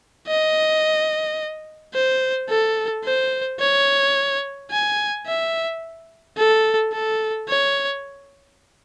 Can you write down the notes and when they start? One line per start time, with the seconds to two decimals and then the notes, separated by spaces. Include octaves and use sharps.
0.28 D#5
1.94 C5
2.49 A4
3.04 C5
3.60 C#5
4.71 G#5
5.27 E5
6.37 A4
6.93 A4
7.48 C#5